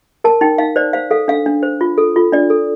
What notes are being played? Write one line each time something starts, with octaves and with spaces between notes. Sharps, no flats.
A#4 A5
D#4 G5
D#4 F5
C5 D5
C5 F5
A4 F5
D4 F5
D4
C5
F4
A4
F4
D4 D5
A4